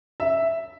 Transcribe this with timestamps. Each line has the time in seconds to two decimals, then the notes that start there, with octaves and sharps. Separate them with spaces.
0.20 E5